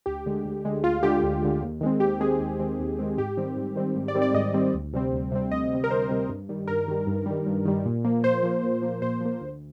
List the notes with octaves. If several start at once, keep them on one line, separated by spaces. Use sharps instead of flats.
D2 G4
D3 G#3
D2
D3 G#3
D2 F4
D3 G#3 G4
D2
D3 G#3
D#2
D#3 G#3 C4
D#2 G4
D#3 G#3 C4 G#4
D#2
D#3 G#3 C4
D#2
D#3 G#3 C4
G#2 G4
D#3 G3 C4
G#2
D#3 G3 C4
G#2
D5
D#3 G3 C4
D5
G#2 D#5
D#3 G3 C4
D2
C3 G3 C4
D2
C3 G3 C4
D2 D#5
C3 G3 C4
A#4
D2 C5
C3 G3 C4
G2
D#3 G3
G2 A#4
D#3 G3
G2
D#3 G3
G2
D#3 G3
A#2
F3 A#3
A#2 C5
F3 A#3
A#2
F3 A#3
A#2 C5
F3 A#3
D2